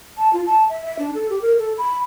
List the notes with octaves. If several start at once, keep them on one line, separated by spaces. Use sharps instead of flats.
A5
F4
A5
E5
E5
D4
A4
G4
A#4
A4
B5